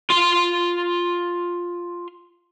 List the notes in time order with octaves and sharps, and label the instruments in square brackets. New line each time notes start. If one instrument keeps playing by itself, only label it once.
[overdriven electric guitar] F4 C6